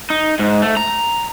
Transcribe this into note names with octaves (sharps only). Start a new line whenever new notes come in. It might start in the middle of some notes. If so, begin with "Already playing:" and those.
D#4
G#2
A3
A#5